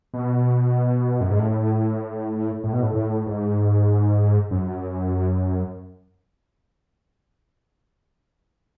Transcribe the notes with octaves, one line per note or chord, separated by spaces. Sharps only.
B2
F#2
G#2
A2
A2
B2
A2
A2
G#2
F#2